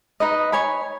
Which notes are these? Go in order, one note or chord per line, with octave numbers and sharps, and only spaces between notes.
D#4 B4 D#5
C#5 G#5 B5